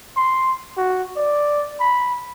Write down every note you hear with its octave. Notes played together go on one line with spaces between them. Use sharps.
C6
F#4
D5
B5